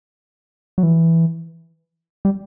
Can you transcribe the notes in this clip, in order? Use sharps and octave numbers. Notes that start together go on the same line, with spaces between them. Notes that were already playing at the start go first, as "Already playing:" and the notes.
F#3
E3
G3